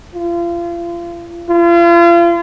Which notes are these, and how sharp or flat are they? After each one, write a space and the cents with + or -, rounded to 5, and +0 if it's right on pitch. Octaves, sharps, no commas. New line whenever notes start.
F4 -35
F4 -35